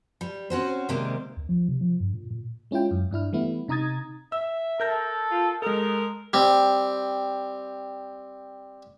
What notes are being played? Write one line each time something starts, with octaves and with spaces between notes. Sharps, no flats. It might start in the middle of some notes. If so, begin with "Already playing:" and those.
G3
C4 C#4 F#4 C5
C3 D#3 G3 G#3 A#3 C4
D2
F3
C3
F3
G2
A#2
A#2
G#3 C#4 E4 F4 G5
F#2
G2 D4 E4 F6
E3 G3 A3 B3 E4
C3 D#4 A#5 D#6 G#6 A6
E5 E6
A4 A#4 G6 A#6
F4
G#3 D#4 A4 A#4
G3 C4